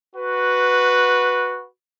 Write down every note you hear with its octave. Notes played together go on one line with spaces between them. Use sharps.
F#4 B4